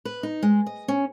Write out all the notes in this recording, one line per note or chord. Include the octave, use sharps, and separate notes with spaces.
B4
D#4
G#3
D#5
C#4